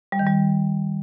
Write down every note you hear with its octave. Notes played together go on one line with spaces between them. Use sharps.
G3
D#3
G3